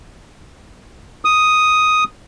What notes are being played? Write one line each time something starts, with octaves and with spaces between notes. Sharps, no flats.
D#6